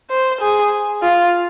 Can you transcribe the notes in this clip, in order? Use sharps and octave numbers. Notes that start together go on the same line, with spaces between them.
C5
G#4
F4